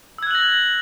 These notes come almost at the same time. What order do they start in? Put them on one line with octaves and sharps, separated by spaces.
E6 G#6 F#6 F#7 A#6